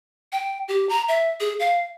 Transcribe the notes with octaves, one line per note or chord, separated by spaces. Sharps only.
G5
G4
A#5
E5
G#4
F5